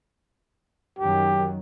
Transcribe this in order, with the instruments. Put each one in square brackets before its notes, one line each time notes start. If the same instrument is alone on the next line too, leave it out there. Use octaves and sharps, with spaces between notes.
[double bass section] F#2 D#3 F#3 [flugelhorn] G4